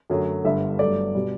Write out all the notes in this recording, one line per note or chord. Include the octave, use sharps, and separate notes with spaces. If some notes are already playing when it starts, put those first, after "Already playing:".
F#2 D3 F#3 A3
G1 G2 D3 E5
G1 G2 F#3 A3 D5
B2 G3